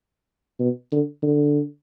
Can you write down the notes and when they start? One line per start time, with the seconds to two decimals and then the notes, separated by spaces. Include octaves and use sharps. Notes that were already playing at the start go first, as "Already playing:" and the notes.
0.60 B2
0.92 D3
1.23 D3